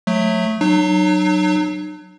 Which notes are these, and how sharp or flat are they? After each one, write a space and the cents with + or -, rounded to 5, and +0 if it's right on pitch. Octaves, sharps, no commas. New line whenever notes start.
F#3 -25 A3 +0
F#3 +5 D#4 -45